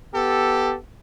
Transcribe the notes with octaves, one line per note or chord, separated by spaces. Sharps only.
B3 G4 A4